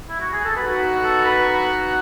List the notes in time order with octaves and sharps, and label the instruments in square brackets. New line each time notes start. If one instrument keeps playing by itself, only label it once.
[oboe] E4
F#4
G#4
A4
[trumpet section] B3 D#4 F#4 [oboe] B4
[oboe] A4
B4